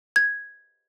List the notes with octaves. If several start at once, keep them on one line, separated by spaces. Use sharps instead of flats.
G#6